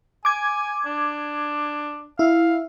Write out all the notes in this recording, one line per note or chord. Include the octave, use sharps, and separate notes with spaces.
G#5 D6 G#6
D4
E4 F5